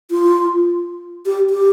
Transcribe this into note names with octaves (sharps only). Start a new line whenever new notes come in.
F4
G4
G4